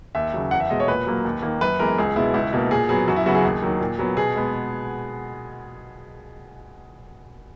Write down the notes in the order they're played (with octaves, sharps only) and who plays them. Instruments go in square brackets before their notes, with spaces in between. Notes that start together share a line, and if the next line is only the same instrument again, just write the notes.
[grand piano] D#2 E5
C#3 F#3
E2 F#5
E5
B2 G#3 D#5
C#5
A#2 B4
F#3 A#3
D#2
D#3 A#3
F#2 B4
E3 G#3 B3 A#4
C#2 G#4
B2 G#3 B3 E4
C#2 E4
B2 A#3
A#2 G#4
F#3 B3 G#4
F#2 F#4
E4
C#3 F#3 B3 F#4
G#4
D#2
D#3 F#3
A#2
F#3 B3
B2 G#4
G#3 B3